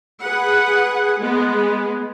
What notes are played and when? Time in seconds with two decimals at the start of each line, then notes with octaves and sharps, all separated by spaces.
0.22 G#4 B4 F#5
1.20 G#3 B3